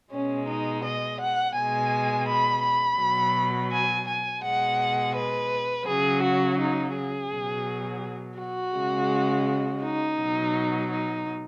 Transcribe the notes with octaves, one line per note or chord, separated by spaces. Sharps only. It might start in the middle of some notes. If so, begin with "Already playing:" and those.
B2 G#3 C#4
D#4
D#5
F#5
B2 G#3 G#5
B5
B5
B2 F#3
G#5
G#5
B2 G#3 F#5
B4
C#3 F#3 G#4
F#4
D#4
G#4
B2 F#3
F#4
C#3 G#3
D#4
B2 F#3
D#4